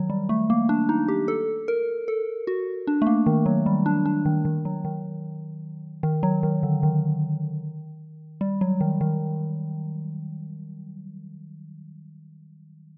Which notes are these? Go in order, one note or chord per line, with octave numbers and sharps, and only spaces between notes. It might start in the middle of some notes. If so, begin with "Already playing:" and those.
Already playing: D#3 F#3
G3
A3
A#3
D4
D#4
G4
A4
A#4
A4
F#4
D4
A3
A#3
D#3
F#3
G3
D4
D4
D#3
D#3
F#3
D#3
D#3
F#3
D#3
D3
D#3
G3
F#3
D#3
D#3